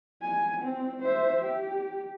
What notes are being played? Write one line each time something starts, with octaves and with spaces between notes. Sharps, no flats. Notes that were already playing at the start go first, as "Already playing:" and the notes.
G#5
C4
C5 E5
G4